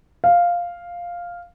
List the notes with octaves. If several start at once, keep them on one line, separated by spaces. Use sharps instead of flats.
F5